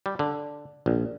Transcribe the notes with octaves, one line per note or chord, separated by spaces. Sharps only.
G3
D3
A#1